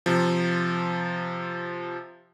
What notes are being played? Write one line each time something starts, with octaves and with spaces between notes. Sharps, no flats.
C3 F3